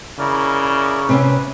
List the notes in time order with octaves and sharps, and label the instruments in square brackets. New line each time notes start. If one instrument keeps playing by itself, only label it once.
[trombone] C#3 [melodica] E4 A#4 D5
[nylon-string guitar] C3 C4 C#4 [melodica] B4